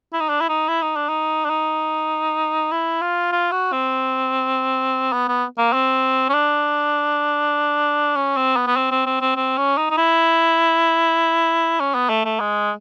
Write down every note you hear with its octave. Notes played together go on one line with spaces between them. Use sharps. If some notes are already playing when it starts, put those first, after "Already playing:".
E4
D#4
D4
E4
D#4
E4
D#4
D4
D#4
D4
D#4
E4
F4
F4
F#4
C4
B3
B3
A#3
C4
C#4
D4
C#4
C4
B3
B3
C4
C4
C4
C4
C4
C#4
D#4
D#4
E4
C#4
B3
A3
A3
G#3